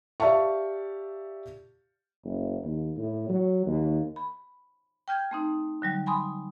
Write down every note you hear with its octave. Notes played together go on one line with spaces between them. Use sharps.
G4 D5 E5 F5 A5 C#6
F#1
D#2
A2
F#3
D#2
B5
G5 F6 G6 G#6
A3 C4 D#4
D3 F#3 G3
G#5 B5 C6 D#6